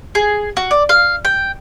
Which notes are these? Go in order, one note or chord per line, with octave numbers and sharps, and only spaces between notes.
G#4
F#4
D5
F5
G5